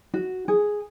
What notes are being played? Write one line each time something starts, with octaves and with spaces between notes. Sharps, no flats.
F#4
G#4